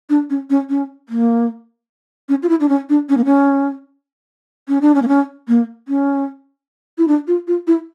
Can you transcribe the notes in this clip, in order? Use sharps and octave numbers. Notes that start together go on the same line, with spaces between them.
D4
C#4
C#4
C#4
A#3
C#4
F4
E4
D4
C#4
D4
C#4
A#3
C#4
C#4
D4
C#4
A#3
C#4
A#3
C#4
E4
D4
F4
F4
E4